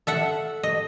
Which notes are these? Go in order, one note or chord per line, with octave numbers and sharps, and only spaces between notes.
A4 E5 F#5
D#5